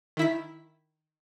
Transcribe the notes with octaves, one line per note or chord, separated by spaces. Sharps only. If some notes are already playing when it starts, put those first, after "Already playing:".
D#3 E4 B6